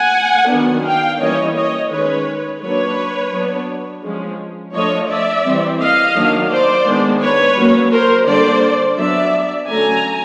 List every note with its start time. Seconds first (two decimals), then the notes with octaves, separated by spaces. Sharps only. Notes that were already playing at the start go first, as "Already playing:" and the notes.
Already playing: F#5 G#5
0.50 D#3 F#3 B3 D4
0.85 F5 G5
1.21 E3 G3 A#3 C#4 C#5 D#5
1.56 C#5 D#5
1.91 D#3 G#3 C#4 B4 C#5
2.62 F#3 A#3 D4 B4 C#5
3.33 F#3 B3 D4
4.04 F3 G#3 C#4
4.74 F3 A3 D4 C#5 D#5
5.09 D5 E5
5.45 E3 G3 C4
5.80 D#5 F5
6.16 D#3 F#3 A#3 D4
6.51 C5 D5
6.86 D#3 G#3 B3 D4
7.22 B4 C#5
7.57 F#3 A#3 C#4
7.92 A#4 C5
8.27 D3 G3 A#3 C5 D5
8.98 F#3 B3 D4 D5 E5
9.68 D3 F#3 A3 C#4 G#5 A#5